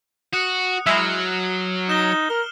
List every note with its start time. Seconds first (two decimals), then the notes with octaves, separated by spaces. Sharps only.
0.33 F#4 D#6 F#6 C#7
0.86 F#3 G#3 E4 F6 C7 F#7
1.89 D#4 E7 G7
2.30 A#4 F6